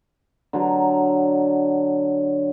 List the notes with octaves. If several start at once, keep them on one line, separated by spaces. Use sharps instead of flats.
D3 F#3 A#5